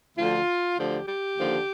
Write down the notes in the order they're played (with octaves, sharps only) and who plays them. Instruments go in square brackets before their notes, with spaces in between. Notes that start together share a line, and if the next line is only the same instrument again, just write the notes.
[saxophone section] D2 D3 F3 F4
D2 D3 F3 G4
G4
D#2 D3 F3